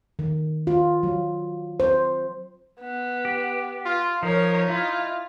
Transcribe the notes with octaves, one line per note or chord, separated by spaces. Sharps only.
D#3
F4
F#3
C5
B3
G4
F4
F3 D#4 A#4 C#5
E4 F4